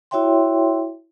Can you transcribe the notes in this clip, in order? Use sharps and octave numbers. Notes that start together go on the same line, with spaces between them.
E4 F#4 C#5 E5 G5 C6